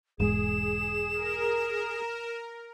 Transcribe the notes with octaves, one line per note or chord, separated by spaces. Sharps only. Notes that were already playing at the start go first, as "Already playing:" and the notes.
E1 G#2 G#3 G#4 E7
A#4